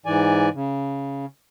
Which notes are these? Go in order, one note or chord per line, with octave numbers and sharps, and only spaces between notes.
G#2 E3 D5 G#5
C#3